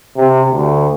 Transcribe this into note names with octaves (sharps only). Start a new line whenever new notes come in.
C3
D2